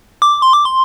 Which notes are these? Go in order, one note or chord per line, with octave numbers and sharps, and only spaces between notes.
D6
C6
D6
C6